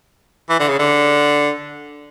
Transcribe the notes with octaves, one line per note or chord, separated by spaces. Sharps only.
E3
D3
C#3
D3